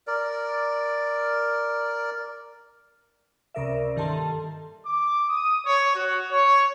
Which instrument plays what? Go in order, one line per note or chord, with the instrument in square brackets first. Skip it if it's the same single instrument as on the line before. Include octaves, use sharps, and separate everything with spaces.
[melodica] A#4 D5
[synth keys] C#2 C3 A#4 D5 E5
G2 D#3 A#3 A4 A5 C6
[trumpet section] D6
D#6
C#5
F#4
C#5